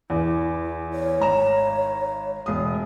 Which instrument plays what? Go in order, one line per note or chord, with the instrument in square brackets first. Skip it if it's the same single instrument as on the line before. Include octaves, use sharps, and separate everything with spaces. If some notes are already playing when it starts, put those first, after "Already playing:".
[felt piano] E2 [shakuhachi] E4
[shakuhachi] C#5
[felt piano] G#1 A#5 E7
E1 D#6